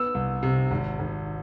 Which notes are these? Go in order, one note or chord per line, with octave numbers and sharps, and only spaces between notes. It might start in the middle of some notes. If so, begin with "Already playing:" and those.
Already playing: B3 E6
C2
C3
G#1
G#1